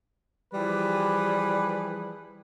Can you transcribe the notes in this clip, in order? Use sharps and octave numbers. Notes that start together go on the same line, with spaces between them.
E3 F3 G3 G4 G#4 B4